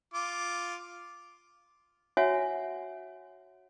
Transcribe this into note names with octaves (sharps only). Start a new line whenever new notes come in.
F4 D6
F#4 C#5 E5 F#5 G#5